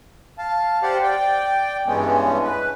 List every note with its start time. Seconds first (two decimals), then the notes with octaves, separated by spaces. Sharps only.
0.38 F5 A5
0.83 G4 C5 D5 F5 F#5
1.03 D5 G5
1.87 G2 E3 G#3 B3 C#4
2.44 B4